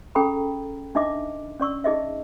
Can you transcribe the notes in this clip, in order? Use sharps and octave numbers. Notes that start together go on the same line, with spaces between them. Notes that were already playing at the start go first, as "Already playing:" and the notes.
C#4 G#4 A4 G5 A#5 B5
D4 D#4 D#5 E5 D6
C#4 D5 C#6 E6
D#4 G#4 D#5 E5